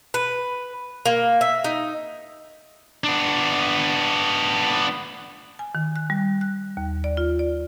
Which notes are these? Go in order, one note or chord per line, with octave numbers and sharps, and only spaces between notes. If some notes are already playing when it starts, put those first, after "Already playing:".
B4
A#3
E5
D#4
B3 D4
G#5
D#3
F#6
G3
F#6
D#2
D5
F4
D5